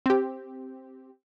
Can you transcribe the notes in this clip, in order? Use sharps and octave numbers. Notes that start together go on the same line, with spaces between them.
C4 G4